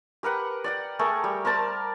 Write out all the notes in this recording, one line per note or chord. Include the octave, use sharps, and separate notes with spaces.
G4 A#4 B4 F#5
D5 F#5 G5
A3 G#4 A#4 C#6
G3
A#4 C5 D5 A5